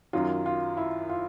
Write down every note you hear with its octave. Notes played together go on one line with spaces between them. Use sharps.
F#2 D#3 F#3 F4
F4
E4
F4